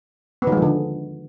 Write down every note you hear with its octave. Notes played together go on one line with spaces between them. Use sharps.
B3
D#3
G#3
F3
D3